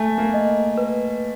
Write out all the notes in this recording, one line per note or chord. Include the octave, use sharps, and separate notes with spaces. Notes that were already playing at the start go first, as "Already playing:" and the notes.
Already playing: A3 G#5
A#3
D#5
B4